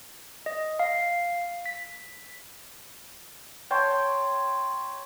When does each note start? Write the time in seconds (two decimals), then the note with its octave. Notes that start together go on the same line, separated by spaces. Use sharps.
0.46 D#5
0.80 F5
1.66 B6
3.70 C#5 G5 A5 C6